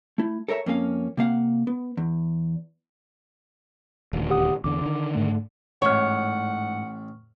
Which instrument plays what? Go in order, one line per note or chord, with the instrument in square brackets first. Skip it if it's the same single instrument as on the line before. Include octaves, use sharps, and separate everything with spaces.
[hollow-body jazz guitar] A3 E4
A4 A#4 C#5 E5 A#5
F2 A#3 C#4 F#4 F5
C3 A#3 F5 F#5
B3
E2
[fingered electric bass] D#1 D2
[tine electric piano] G4 F#5 D#6
[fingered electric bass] E2 D3 [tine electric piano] D6
[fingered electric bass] D3 D#3
[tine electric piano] G#2 A3
[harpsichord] A1 [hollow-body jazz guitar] G#2 C#5 [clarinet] F#5 [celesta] C#6 F6